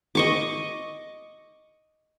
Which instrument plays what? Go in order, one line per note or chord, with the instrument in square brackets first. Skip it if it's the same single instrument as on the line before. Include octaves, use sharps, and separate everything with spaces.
[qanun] D#5 C#6 D6